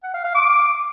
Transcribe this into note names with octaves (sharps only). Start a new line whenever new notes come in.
F#5
F5
F5
D6